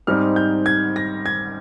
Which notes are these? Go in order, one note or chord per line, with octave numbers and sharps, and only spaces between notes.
G#2 G3 C4 D#4 F6
G6
G#6
A#6
G#6